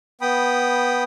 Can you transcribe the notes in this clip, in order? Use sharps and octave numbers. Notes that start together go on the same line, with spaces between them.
B3 G5 B5 D#6